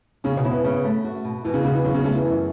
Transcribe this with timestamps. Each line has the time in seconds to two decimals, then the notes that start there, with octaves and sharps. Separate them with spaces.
0.24 C#3 C#4
0.37 B2
0.45 E4
0.51 B3
0.64 C#3
0.85 A3
1.04 F#4
1.24 B2
1.45 B2 E3
1.54 C#3
1.64 C#3 B3
1.75 E3
1.84 C#3 F#3
1.94 C#3
2.04 C#3 A3
2.15 E3
2.25 F#2